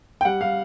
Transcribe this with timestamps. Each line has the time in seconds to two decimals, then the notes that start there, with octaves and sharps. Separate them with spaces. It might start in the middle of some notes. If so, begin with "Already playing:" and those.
0.21 G5
0.25 G3 F#5
0.41 G3 F5